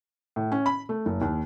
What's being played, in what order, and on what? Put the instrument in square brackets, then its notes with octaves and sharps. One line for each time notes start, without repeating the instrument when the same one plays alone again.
[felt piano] A2
C#4
B5
A3
F#1
D#2